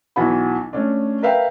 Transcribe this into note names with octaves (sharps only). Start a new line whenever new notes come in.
B1 E3 F#4 F#5 B5
A3 C#4 D4
A#4 B4 E5 F5 G5